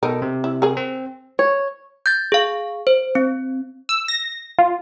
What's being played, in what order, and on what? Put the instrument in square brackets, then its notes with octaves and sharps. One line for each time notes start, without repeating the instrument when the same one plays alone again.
[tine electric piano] B2 A4 [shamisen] D#4 A#4
[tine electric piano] C3
[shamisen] E4
G#4 A#4
[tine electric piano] C4
[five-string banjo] C#5
[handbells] G6 A6
G#4 F5
C5
C4
[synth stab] E6
A#6
F4